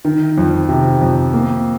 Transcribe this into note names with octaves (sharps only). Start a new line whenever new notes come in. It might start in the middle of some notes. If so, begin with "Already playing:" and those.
D#3
F2
C3
F2
A#3